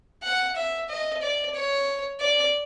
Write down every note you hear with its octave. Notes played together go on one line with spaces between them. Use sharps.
F#5
E5
D#5
D5
C#5
D5